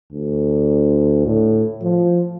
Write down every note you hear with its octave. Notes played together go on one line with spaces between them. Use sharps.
D2
A2
F3